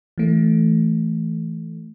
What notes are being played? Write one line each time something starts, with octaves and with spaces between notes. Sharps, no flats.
E3 A3